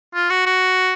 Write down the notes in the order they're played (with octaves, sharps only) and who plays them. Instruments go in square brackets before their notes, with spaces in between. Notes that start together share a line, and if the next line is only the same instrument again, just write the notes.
[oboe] F4
F#4
F#4